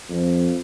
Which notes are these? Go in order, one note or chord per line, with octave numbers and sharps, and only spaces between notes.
F2